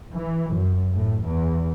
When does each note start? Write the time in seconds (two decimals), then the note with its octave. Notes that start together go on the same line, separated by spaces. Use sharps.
0.13 E3
0.53 F#2
0.93 A2
1.24 E2